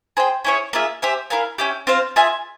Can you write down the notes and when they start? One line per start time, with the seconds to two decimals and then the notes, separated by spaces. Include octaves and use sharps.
0.17 G#4 C5 G5
0.44 C#4 E4 G#4 C#5
0.73 A#3 F4 G#4 E5
1.02 G4 C5 E5 G#5
1.30 E4 A#4 F5 G#5
1.58 C#4 E4 G4
1.87 C4 F4 C5 F5
2.16 F4 G#4 E5 G#5